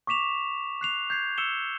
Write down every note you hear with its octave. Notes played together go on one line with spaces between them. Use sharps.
C#6 D6 B6 E7 F7
F#6 C7 F7
G6 G#6 C7
E6 C#7 E7 G7